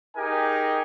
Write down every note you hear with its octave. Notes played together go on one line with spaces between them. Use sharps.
D#4 G4 G#4 A#4 G#5